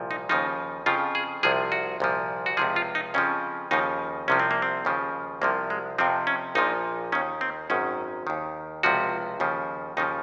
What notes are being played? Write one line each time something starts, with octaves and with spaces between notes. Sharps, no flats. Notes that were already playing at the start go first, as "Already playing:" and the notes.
Already playing: C2 A#2 F3
D#4
D#2 C#3 F3 D#4
F2 C#3 F3 F4
G#4
C2 C3 F3 G#4
F#4
C2 A#2 F3
F#4
C#2 C3 F3 G#4
F4
D#4
F2 C#3 F3 C#4
D#2 C#3 F3 D#4
C2 C3 F3 C#4
C4
A#3
C4
D#2 C#3 F3
C2 C3 F3 A#3
G#3
F2 C3 F3 C4
C#4
A#1 A#2 F3 D#4
D#2 D#3 C#4
C4
G#1 F#2 D#3 C#4
D#2 D#3
C#2 C3 F3 F#4
D#2 C#3 F3
D#2 C#3 F3 D#4